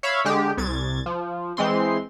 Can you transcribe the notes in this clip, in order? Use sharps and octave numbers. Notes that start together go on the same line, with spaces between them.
C#5 E5 F5 B5
D3 G#3 G4
C2 G#6 A6
F3
E3 G#3 C4 C6